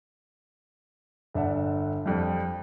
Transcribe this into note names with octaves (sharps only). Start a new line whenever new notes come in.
G1 D4 E5 F#5
F2 G3